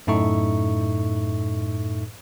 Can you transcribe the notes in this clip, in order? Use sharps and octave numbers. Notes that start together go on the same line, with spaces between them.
F#2 A2 D#4 A4 E5 C#6